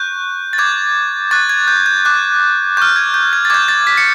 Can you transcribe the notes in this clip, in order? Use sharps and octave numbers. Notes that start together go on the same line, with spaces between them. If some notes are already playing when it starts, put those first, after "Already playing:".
Already playing: C#6 F#6 G6
A6
D6 G6 G#6
C#6 F#6 A6
G#6
G6
G6
D6 F#6
C#6 F6 G6
G#6
G6
G#6
A6
D6 G6 G#6
A6
B6
C#7